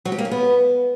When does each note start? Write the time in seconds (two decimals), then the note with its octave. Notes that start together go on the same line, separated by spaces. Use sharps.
0.05 F#3
0.12 G4
0.18 A#3
0.25 C#4
0.31 B3